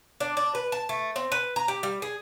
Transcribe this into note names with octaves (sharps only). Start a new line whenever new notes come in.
D4
D4
B4
A5
A3
C4
B4
A#5
G4
G3
G#4